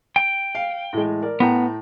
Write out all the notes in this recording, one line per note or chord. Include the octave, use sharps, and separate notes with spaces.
G5
F5
A2 E3 G#3
A#4 D5
A2 B3 G5 A#5